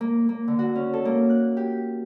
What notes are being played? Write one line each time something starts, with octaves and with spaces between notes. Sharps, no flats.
A#3
A#3
D3
F#4
C#4
A4
A#3
F#6
G4